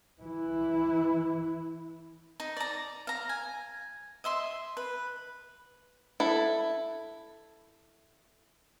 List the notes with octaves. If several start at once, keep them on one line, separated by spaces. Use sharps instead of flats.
E3 E4
D#4
D5 A#5
F5 A#5
G#5
D#5 E5 C6
B4
E4 A4